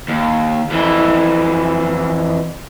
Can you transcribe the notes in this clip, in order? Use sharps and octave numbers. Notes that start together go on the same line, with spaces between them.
D#2
F2 E3